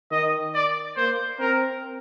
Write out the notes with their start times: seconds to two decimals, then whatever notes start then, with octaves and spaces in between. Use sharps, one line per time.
0.11 D#3 D#5
0.54 D5
0.97 A#3 C5
1.39 C4 A#4